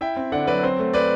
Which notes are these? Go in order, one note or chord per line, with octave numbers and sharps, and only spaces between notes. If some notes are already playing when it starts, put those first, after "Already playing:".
E4 E5 G5
C4
D3 D5 F#5
F#3 B4 D5
C4 C5
A3
B4 D5